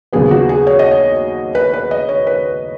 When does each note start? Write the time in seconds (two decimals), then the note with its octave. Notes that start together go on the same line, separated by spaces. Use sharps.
0.13 D#2 C#3 F#3 B3 G#4
0.31 F#4
0.49 G#4
0.67 C#5
0.79 D#5
0.91 C#5
1.55 B4
1.74 B4
1.91 D#5
2.09 C#5
2.27 B4